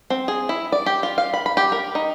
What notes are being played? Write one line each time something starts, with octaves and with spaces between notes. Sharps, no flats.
C4
G#4
E4
D5
G4
F4
F5
B5
B5
G4
A#4
D#4